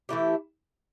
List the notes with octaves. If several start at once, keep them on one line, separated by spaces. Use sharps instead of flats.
E3 A3 E4 G4